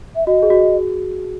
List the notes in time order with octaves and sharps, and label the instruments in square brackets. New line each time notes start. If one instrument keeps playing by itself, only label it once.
[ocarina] E5
[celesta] F#4 [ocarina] D#5
[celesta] G#4
F#4